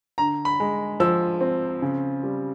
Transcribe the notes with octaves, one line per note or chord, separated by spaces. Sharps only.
D3 A#5
B5
G#3
F3 E6
C4
C#3
G3